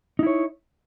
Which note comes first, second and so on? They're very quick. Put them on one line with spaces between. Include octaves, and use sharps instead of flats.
D#4 E4 C#5